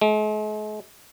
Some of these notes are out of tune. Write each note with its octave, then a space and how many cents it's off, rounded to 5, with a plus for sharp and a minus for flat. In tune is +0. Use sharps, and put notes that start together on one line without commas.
G#3 +45